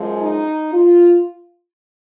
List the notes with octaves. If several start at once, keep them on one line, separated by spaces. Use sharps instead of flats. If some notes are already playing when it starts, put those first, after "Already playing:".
Already playing: F#2 F3 G#3
D#4
F4